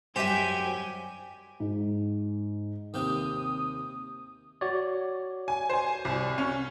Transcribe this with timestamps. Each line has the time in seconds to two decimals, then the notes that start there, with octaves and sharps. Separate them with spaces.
0.16 F#2 G3 F#4 G4 C5 E5 G5 G#5
1.60 G#2
2.94 D#2 C3 G4 D#6
4.61 F#4 C#5 D5
5.48 G#5
5.70 C5 G#5
6.05 C2
6.38 C#4